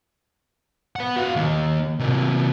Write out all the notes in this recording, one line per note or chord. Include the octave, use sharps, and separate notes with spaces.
B4 F#5
F#4 F5
D#3 A#3
C3 A#3